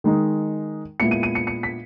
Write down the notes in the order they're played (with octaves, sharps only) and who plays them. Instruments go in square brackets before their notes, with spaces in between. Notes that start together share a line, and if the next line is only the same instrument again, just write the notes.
[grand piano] D#3 G#3 D#4
A#2 G#3 B3 E4 C#7
D#7
D#7
C#7
C#7
B6